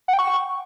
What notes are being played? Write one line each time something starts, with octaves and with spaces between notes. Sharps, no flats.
F#5
G5
C#6